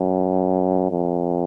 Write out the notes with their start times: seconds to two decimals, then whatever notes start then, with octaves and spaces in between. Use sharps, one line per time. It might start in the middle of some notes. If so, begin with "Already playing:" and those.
Already playing: F#2
0.90 F2